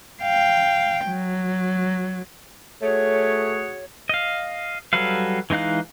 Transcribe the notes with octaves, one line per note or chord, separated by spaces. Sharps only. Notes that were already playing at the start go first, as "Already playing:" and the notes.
F5 G5
F#3
A3 F#4 G#4 C#5
D#5 F5
F#3 G3 A4 B4 F5
E3 G#3 D#4 F5 F#6